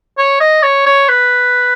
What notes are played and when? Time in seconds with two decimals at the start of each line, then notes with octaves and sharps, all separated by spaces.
0.18 C#5
0.40 D#5
0.63 C#5
0.86 C#5
1.09 B4